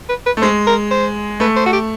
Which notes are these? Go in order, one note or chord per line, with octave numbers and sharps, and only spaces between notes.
B4
B4
A3
G#3 C5
A#4
C5
A3 B4
C5
F#4
G4